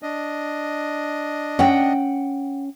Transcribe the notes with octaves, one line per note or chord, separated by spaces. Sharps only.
D4 D#5
C#4 F#5 G5